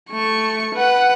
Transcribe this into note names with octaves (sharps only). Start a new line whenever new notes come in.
A3 C#6
B4 F#5